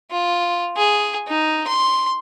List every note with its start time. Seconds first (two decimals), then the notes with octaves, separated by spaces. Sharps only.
0.11 F4
0.77 G#4
1.28 D#4
1.67 C6